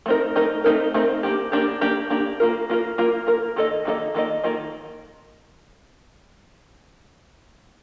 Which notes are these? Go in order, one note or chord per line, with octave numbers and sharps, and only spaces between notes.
A3 C4 D#4 A#4
A3 C4 D#4 A#4
A3 C4 D#4 A#4
A3 C4 D#4 A#4
A#3 D4 G4
A#3 D4 G4
A#3 D4 G4
A#3 D4 G4
A#3 F4 A#4
A#3 F4 A#4
A#3 F4 A#4
A#3 F4 A#4
D#3 A#3 F4 A4 D#5
D#3 A#3 F4 A4 D#5
D#3 A#3 F4 A4 D#5
D#3 A#3 F4 A4 D#5